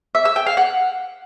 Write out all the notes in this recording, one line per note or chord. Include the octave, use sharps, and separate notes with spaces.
E5
E6
G5
F5
F#5